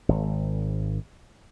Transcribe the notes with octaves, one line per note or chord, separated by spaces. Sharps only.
G#1